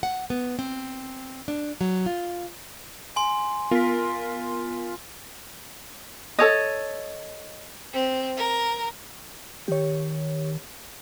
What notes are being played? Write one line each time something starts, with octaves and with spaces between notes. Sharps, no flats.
F#5
B3
C4
D4
F#3
F4
G#5 C6
B3 F4 A#4 B6
A4 C#5 D#5
C4
A#4
D#3 G4 C#5